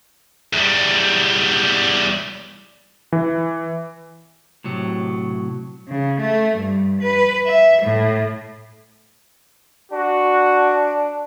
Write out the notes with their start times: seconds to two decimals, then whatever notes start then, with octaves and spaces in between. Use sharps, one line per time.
0.53 E2 G3
3.12 E3
4.64 A2 C3 F#3
5.89 C#3
6.20 A3
6.57 G2
7.01 B4
7.47 E5
7.82 A2
9.92 D4 F#4